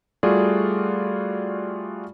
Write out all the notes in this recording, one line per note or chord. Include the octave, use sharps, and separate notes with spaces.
G3 A3 F4 F#4 G#4 D5